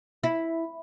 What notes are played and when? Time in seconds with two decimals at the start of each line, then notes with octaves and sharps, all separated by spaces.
0.24 E4